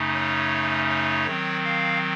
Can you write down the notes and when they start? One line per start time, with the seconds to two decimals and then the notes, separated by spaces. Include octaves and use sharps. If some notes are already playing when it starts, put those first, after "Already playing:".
Already playing: F#2 C#3 A3 D#4
0.13 C#5
0.89 C#5
1.27 D#3 F#3 C4
1.64 F5